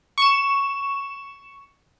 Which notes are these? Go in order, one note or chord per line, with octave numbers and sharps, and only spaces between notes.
C#6 E7